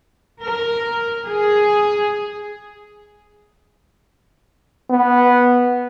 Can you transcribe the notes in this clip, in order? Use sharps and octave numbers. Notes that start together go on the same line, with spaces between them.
A#4
G#4
B3